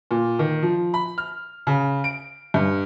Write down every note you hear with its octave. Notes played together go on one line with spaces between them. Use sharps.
A#2
D#3
F3
B5
F6
C#3
D7
G2